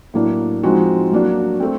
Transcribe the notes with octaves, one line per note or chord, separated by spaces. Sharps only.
A2 F#3 A#3 D4
F3 G#3 C4 D#4 F#4
F#3 A#3 D4 F#4
A3 C4